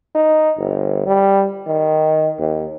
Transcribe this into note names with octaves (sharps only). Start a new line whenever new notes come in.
D#4
G1
G3
D#3
D#2